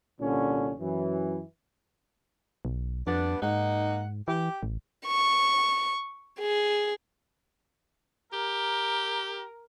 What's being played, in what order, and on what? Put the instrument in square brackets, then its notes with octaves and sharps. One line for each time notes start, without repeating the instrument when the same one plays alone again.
[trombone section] C2 A#2 D3 C#4
F#2 E3
[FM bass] B1
[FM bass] F2 [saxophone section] G3 B3 D4
[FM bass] G#2 [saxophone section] A#3 D#4 F#5
[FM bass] E3 [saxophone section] G4
[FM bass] A1
[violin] C#6
G#4
[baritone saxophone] G4 [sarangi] A#4